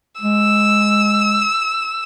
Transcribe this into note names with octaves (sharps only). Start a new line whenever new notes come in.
G#3 E6